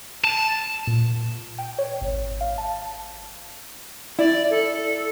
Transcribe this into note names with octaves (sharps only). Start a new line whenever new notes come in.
A5
A#2
G5
C#5
G#1
F5
A5
E4 D5
A4